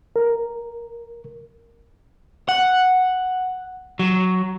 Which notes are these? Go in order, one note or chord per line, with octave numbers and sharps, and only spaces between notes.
A#4
F#5
F#3